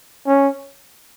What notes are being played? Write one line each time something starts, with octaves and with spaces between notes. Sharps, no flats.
C#4